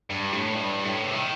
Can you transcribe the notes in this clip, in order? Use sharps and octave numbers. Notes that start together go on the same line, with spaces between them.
G2
A2
G2
A2
C3
D#3